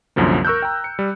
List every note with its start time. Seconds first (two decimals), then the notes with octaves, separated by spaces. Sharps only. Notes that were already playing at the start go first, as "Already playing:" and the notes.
0.16 C2 F#2 D3 F3 A#3
0.45 A#4 C#6 E6 F#6 G6
0.62 G5 A#5
0.84 C#7
0.99 G3